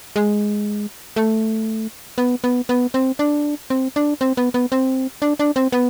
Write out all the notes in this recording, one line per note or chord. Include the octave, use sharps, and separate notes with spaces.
G#3
A3
B3
B3
B3
C4
D4
C4
D4
C4
B3
B3
C4
D4
D4
C4
B3